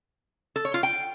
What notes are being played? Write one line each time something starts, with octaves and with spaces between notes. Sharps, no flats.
A4
C#5
F4
G5